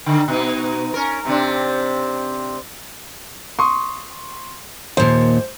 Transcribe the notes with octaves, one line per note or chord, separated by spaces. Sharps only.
D3 D#3
B2 D#4
C#4 A#4
C3 C4 D4
C6 C#6 D#6
D#2 A#2 C5